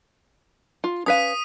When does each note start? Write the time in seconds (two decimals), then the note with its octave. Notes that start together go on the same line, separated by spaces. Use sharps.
0.84 F4
1.06 C#4 B4 F5 D#6 B6 D#7